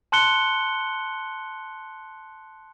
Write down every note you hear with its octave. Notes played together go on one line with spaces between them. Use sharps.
A5 C6 F#6 C#7 G7